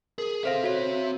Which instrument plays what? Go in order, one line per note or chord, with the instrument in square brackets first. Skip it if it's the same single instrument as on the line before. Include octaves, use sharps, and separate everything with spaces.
[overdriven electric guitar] G#4 [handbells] A#4
[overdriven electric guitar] C4 E5 [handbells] A4 C5 F5
[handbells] F#4 C#5